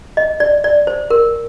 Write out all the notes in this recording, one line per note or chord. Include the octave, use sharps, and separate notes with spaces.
D#5
D5
D5
C5
A#4